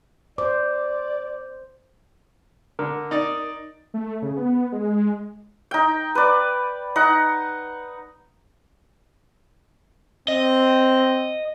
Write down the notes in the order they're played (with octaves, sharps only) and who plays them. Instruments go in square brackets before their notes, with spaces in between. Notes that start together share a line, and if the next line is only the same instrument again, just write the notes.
[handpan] C5 [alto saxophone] D5 [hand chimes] D6
[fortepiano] D3 [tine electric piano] A#4
[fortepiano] D#4 D5
[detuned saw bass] A3
C#3
B3
G#3
[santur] D#4 G5
B4 D5
D#4 F#5
[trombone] C4 [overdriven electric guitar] D#5